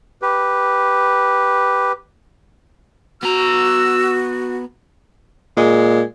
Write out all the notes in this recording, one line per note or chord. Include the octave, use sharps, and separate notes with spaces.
G4 B4
B3 F#4 A#5 E6
A#2 G#3